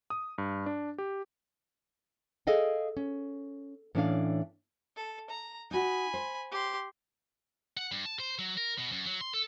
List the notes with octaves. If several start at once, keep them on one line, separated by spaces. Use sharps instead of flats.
D#6
G2
D4
G4
G#4 A4 D#5 F5 G5
C#4
A2 E3 A#3 C#4 D4 F5
A4
A#5
D#4 F#4 G#5 B5
C5
G4 C6
F#5
G2
A5
C5
F#3
A#4
B2
F#2
F#3
C6
A4